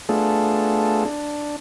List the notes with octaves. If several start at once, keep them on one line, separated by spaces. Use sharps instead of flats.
A3 B3 D4 F4 G#4 A4
D4